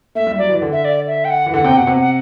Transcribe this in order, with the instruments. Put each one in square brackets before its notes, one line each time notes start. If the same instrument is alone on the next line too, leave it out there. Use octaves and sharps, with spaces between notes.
[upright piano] A3 [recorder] E5
[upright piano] G3
[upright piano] F#3 [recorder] D5
[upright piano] E3
D3
[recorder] E5
D5
E5
G5
F#5
[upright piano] E3
[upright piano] D3 [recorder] F#5
[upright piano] C3 [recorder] G5
[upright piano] B2 [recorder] F#5
[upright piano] C3
[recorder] F#5